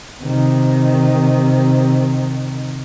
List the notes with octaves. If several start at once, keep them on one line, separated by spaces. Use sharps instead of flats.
C3 D#3